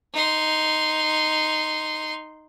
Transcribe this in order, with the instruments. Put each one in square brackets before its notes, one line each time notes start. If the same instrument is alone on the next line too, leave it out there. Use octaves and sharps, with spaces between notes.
[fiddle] D#4 C6